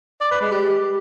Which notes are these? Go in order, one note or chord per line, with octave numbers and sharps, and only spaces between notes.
D5
B4
G#3
G4